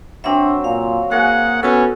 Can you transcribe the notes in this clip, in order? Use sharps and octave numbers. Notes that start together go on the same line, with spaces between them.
F#3 C4 D4 E5
A#2 F5
A#3 F#4 G#4 F#5
B3 C#4 F#4 A4 E5